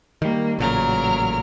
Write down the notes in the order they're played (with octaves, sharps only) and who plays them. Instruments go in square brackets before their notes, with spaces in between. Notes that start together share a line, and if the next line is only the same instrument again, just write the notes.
[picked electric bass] D#3 G3 [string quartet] A#3
[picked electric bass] A1 A#2 C#3 [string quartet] F#3 A#4 F6